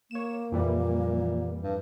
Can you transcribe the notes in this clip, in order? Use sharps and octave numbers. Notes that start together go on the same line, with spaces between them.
A#3 C#5 E7
F2 A#2 E3 G3
G2